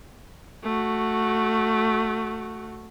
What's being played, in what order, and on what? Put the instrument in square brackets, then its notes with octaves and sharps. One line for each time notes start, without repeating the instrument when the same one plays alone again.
[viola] A3 F#4